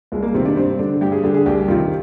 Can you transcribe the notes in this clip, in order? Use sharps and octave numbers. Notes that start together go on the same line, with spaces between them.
C2 G#3
A#3
C3 D#3 C4
D4
G2 C4
D3 D4
G2 G4
G#4
D3 G4
G#4
C2 G4
C3 D#3 F4